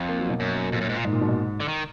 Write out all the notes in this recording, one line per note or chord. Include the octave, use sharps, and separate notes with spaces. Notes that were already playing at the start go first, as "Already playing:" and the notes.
Already playing: F2
A#3
F#3
B2
F#2
F2 A#2
F#2
G#2
A#2
G#2
A#2
B2
G#2
D3
D#3